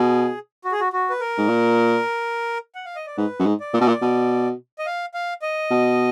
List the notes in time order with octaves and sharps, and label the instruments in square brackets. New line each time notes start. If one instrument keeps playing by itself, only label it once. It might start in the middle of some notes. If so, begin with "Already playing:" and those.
Already playing: [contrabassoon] B2 [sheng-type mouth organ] G#4
[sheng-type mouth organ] F#4
G#4
F#4
F#4
B4
A#4
[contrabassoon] G#2
A#2
[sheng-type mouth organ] F#5
F5
D#5
D5
[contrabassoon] G#2 [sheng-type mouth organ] B4
[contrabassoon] F#2
G#2
[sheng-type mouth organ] D5
[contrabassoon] A#2
B2
A#2
B2
[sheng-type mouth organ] D#5
F5
F5
D#5
[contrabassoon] B2